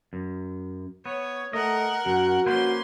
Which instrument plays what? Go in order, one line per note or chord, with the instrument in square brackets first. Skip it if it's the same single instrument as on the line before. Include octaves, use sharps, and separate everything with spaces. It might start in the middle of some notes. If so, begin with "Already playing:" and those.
[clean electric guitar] F#2
[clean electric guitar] B3 [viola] C#5
[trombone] A3 [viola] A#4 F#5 [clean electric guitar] D#5
[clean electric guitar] F#2 [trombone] F#4
[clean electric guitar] A#3 B4 C5 [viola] C#4 C6